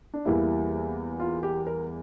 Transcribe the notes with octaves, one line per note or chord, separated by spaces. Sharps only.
D4
E2 E3 G3 A#3 E4
F4
G4
A#4